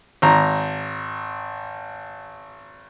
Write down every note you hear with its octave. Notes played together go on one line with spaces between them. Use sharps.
G#1 A#5